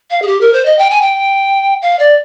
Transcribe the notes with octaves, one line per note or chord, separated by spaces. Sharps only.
F5
G#4
G4
A#4
C5
D#5
G5
G#5
G5
F5
D5